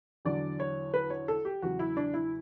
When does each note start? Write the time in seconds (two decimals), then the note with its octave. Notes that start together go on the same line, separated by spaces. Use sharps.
0.25 E2 D3 F#3 D5
0.60 C#5
0.94 B4
1.10 C#5
1.28 A4
1.45 G4
1.62 E2 C#3 F#3 F#4
1.79 E4
1.97 D4
2.14 E4